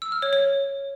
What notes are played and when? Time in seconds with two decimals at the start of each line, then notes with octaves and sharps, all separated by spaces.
0.02 E6
0.12 F6
0.22 C#5
0.33 C#5